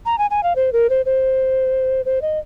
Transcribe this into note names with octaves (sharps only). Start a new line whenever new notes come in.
A#5
G#5
G#5
F5
C5
A#4
C5
C5
C5
D#5